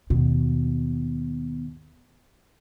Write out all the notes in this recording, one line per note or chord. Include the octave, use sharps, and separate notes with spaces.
D#2 B2